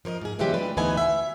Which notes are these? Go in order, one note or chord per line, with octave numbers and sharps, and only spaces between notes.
F3 A#4 C#5 D#5
G#2 G#4
C#3 E3 F#3 G#3 B3 G4
A3 D4 F4 B4
D2 E3 B3 D#4 G#5
E5